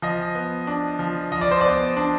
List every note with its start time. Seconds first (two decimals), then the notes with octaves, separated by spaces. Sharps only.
0.02 F3 D#5
0.35 B3
0.67 D4
0.99 F3
1.32 F3 D#5
1.41 D5
1.51 C5
1.61 B3 D5
1.97 D4